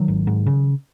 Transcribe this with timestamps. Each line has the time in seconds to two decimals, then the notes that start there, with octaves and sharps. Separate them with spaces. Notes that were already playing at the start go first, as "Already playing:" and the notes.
Already playing: D#3 F#3
0.08 G#1
0.27 G#2
0.46 C#3